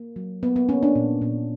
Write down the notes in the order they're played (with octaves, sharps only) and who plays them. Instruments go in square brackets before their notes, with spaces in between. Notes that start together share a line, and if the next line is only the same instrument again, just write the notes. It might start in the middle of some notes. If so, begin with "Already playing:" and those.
Already playing: [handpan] A#3
F#3
A#3 B3
B3
A#3 C#4
D4
A#2
A#2